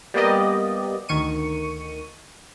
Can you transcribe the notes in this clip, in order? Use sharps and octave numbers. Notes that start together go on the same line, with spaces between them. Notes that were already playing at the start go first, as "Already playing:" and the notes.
G3 A#3 B3 G4 D5 D#5
D2 D#3 C#6 D#7